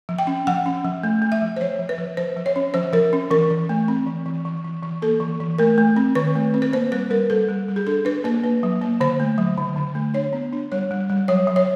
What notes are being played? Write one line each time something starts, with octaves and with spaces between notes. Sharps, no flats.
F3
G5
C#4
F3 F#5
C#4
F3
A3
A3
E5
F3
C5
F3 C#5
F3
B4
F3
F3 C5
F3
C#5
C#4
F3 C5
F3 A#4
C#4
E3 A#4
E3
A3
C4
E3
E3
E3
E3
E3
A#3 A4
E3
E3
A3 A#4
A3
C4
D#3 B4
A3
C4
B4
A#3 C5
G3 B4
G3 A#4
G3 A4
G3
G3
G#4
D4 A4
D4 B4
A#3 B4
A#3
F#3
A#3
D3 C5
A3
F#3
D3
D3
A3
D4 C#5
B3
D4
G3 C#5
G3
G3
F#3 C#5
F#3
C#5